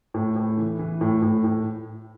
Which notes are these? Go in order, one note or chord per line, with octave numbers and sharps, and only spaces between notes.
A2
A2
E3
E3
A2
A2
A2